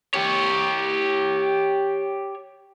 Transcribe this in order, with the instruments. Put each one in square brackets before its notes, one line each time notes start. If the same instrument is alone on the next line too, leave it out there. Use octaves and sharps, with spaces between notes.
[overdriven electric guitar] G4 C#5